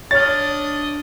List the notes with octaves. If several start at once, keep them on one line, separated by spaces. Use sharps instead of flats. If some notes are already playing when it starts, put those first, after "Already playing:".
D4 C#5 D#5 F6 A6